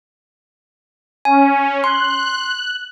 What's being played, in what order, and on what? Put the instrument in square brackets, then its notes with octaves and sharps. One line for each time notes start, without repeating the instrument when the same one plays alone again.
[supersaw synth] C#4 [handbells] G#5
[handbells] C6 [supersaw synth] F#6